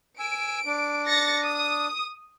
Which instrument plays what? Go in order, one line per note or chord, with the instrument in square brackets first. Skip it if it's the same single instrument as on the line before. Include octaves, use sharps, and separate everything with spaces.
[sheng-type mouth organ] G#5 E6 [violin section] D7
[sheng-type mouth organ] D4
[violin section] A6 A#6 C#7
D#6